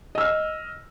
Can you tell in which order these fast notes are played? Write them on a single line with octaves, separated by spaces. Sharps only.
D#5 E6 F6